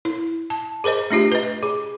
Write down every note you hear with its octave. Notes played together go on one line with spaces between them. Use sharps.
E4
A5
G#4 A#4 C5 D#5
A3 D4 F4 G4
B4 D#5
G#4